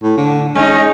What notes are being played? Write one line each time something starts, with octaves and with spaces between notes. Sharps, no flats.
A2
D3
G#3 C#4 D#4